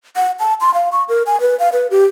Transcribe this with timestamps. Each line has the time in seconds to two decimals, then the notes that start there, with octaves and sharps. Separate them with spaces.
0.16 F#5
0.40 A5
0.61 C6
0.74 F5
0.92 C#6
1.09 A#4
1.26 G#5
1.41 B4
1.59 F5
1.73 B4
1.91 G4